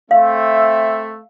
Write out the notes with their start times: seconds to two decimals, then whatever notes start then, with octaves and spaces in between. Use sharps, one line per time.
0.11 A3 C4 E5 F5